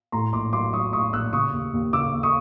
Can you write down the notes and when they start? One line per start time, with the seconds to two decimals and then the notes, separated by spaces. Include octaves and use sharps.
0.12 A2 A#5 C6
0.33 A#1 C6 D6
0.53 F#3 C6 D6
0.73 F#3 C#6 D#6
0.93 A2 C#6 D#6
1.13 A#1 E6 F#6
1.33 C#3 C#6 D#6
1.53 D#2
1.73 D#2
1.93 C#3 D6 E6
2.14 D#2
2.23 C#6 D#6